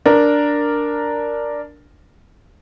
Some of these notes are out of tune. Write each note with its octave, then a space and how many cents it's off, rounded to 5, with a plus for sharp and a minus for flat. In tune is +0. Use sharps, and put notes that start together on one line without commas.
D4 +0 A#4 +0